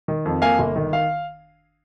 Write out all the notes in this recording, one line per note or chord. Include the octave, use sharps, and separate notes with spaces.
D#3
F2
A#3 F5 G#5
G1
D#3
F5